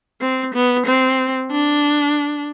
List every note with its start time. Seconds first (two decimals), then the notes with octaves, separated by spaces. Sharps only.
0.21 C4
0.54 B3
0.86 C4
1.51 D4